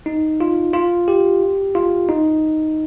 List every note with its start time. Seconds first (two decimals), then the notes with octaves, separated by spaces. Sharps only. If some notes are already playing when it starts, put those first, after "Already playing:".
0.06 D#4
0.41 F4
0.73 F4
1.08 G4
1.75 F4
2.09 D#4